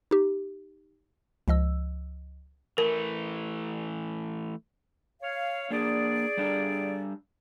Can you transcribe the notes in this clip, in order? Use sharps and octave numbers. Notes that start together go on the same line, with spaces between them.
D#4 G4
C#2 F3 D#5 E6
E3 A3 A#4
C#5 F5
A#3 D4 G#4 D5
G3 D4 A4